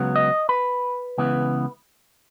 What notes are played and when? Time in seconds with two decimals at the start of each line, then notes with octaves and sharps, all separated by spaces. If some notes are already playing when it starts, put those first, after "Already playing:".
Already playing: C#2 C#3 F#3 B3
0.16 D#5
0.49 B4
1.18 C#2 C#3 E3 B3